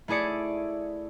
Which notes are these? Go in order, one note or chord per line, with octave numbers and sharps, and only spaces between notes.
A3 E4 G#4 D5 C#7